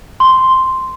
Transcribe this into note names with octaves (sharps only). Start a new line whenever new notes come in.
C6